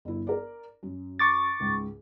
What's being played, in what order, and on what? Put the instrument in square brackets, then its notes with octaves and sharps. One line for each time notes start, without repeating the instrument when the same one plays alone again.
[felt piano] G1 E4
A#4 D5
F#2
[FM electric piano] C#6 D6 A6
[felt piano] C#2 G#2